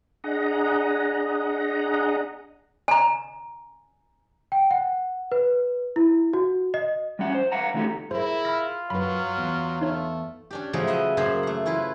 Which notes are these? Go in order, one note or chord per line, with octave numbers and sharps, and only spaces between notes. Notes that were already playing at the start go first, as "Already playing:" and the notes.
D4 G#4 D#5 F#5 A#5
G#5 A#5
G5
F#5
B4
E4
F#4
D#5
G3 C#4 F#5
C5
B4 F5 F#5 A#5
D#3 A3 D#4 G4 A4
E4 G#4 A#4 C5
F4 B5 E6 A#6
F#2 F#3 B4 B5
E2 B3
A3 D#4 C#5
C#4 D4 G4
C#3 F3 F#3 G#3 A3
B4 D#5 E5
F#2 C#3 A#3 G#4 C5 B5
A3 F#5
C#4 E4 F4 B4